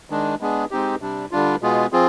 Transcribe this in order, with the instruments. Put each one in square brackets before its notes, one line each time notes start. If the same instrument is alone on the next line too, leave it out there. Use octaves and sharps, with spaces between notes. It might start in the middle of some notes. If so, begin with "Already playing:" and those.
[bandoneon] D#3 G#3 D4
G#3 B3 D4 G#4
G#3 C4 D#4 G4
C3 G3 D4
D3 G3 D4 F4
B2 G#3 B3 F4 G#4
F3 C4 F4 G#4